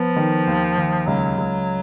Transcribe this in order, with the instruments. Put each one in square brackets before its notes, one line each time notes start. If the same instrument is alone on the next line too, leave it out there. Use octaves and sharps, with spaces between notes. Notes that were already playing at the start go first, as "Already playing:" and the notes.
Already playing: [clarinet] F3 [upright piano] B3
[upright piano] D#3
D#2
D#2
[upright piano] C#2 [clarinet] F#3
[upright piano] C#2